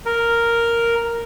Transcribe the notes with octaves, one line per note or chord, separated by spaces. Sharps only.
A#4